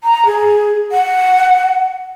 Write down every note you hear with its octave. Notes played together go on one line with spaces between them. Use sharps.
A#5
G#4
F#5